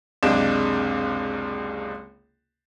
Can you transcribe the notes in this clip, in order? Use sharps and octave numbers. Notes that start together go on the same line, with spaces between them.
F#1 C#2 C3 G#3 D4 E7